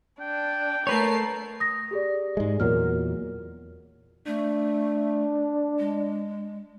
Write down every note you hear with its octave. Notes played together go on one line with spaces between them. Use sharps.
D4 G5
A3 A#4 B4 C#5 A5 C7
D#6 A#6
G4 G#4 D5
G#2 G#3
E2 A#2 F#3 A#4 F6
A3 D4
G#3